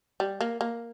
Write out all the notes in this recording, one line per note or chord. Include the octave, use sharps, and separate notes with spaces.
G3
A#3
A#3